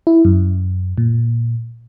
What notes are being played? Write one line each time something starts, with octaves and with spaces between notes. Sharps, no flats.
E4
F#2
A#2